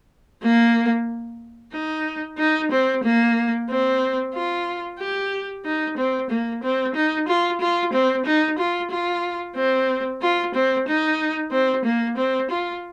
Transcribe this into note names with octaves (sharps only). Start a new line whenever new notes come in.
A#3
D#4
D#4
C4
A#3
C4
F4
G4
D#4
C4
A#3
C4
D#4
F4
F4
C4
D#4
F4
F4
C4
F4
C4
D#4
C4
A#3
C4
F4